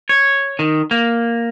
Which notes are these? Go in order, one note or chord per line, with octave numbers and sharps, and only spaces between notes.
C#5
D#3
A#3